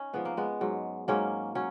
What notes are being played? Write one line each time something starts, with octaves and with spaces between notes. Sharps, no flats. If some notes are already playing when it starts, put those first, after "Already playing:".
Already playing: C#4 D#4
G#2 F3 B3
A#3
G#3 B3
G#2 F#3
G#2 F#3 A#3 C#4
F#3 C#4